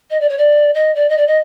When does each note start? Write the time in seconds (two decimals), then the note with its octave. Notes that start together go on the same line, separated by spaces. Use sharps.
0.10 D#5
0.20 D5
0.29 C#5
0.37 D5
0.74 D#5
0.95 D5
1.09 D#5
1.17 D5
1.27 D#5